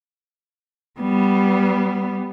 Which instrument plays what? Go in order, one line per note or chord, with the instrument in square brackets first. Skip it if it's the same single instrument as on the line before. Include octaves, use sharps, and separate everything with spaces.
[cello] G3 B3